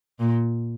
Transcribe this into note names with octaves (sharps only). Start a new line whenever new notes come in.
A#2